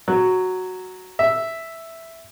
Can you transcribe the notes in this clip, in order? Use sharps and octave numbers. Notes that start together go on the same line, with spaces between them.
F#3
E5